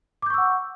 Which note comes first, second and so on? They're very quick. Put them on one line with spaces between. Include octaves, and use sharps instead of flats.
D6 G6 C#6 E6 F#5